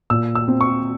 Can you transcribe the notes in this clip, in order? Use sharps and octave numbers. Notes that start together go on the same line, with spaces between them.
A#2 E6
E6
C4
C#6